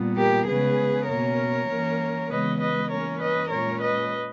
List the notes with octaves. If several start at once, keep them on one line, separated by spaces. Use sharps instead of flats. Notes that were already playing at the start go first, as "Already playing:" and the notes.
Already playing: A#2 G3 B3
G4 A#4
C#3 G#3 B3 G#4 B4
B2 A#3 C#4 A#4 C#5
E3 A#3 C#4
C#3 E3 G#3 B3 B4 D#5
B4 D#5
E3 A#3 C#4 A#4 C#5
B4 D#5
A#2 G#3 C#4 A#4 C#5
B4 D#5